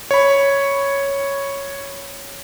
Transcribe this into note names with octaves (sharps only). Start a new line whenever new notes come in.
C#5 B5